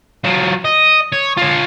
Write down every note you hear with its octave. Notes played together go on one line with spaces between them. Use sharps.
F#3 F4
D#5
C#5
F4 C#5